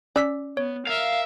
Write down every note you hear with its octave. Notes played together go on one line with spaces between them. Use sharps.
C#4 D5 E6 B6
B3 C#5
A#4 E5 F5